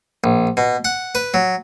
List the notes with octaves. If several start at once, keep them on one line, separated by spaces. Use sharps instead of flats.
A#1
B2
F#5
B4
F#3